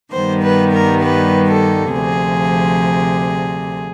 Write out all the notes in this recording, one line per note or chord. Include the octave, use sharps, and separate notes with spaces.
G2 D#3 G3 B3 C5
B4
A#4
B4
A4
D2 C3 F3 G#4